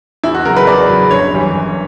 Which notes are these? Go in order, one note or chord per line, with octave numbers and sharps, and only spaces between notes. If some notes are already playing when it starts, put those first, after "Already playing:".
E2 E4
F#4
C#3 F#3 A#4
B4
E2 D5
C#3 F#3
G1 C#5
F#2 E3 G3
G1